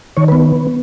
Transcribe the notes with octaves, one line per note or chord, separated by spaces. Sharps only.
D#3 C#5
B4
B3